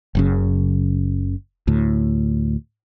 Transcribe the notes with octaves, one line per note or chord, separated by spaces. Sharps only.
F#1 F#2 C#3
D2 A2